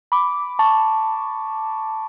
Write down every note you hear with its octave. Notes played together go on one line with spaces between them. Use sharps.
B5 D6
A5 C#6